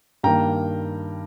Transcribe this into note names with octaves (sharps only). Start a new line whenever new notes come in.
G2 D#3 A#3 G5 A#5